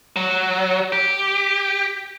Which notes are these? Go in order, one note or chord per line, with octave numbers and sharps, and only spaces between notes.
F#3
G4